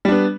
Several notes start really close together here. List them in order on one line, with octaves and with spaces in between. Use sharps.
G3 D4 B3